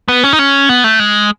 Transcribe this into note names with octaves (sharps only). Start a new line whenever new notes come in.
B3
C#4
D#4
C#4
B3
A3
G#3